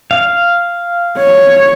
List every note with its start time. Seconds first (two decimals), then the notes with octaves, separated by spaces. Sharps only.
0.11 F5
1.18 C#5